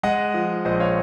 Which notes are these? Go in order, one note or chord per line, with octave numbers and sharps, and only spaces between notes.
G#3 D#5 F#5
F3
A#1 C5 D#5
C#5 F5